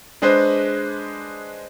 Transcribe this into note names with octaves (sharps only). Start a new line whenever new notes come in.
G#3 D4 G#4 B4 C5 D#5